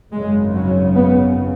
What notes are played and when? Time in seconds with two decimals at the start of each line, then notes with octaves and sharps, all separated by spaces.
0.13 G#1 F#2 C#3 G#3
0.55 F#3
0.96 B3